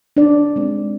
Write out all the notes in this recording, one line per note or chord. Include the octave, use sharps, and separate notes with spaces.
D4 D5
G#3 C4